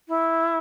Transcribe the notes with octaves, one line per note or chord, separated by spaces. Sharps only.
E4